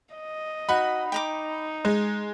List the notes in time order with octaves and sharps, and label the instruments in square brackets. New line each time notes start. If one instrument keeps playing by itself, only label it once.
[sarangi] D#5
[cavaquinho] D#4 F#4 [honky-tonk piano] B5
[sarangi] D#4 [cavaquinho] G5 A#5 D6
[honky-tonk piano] G#3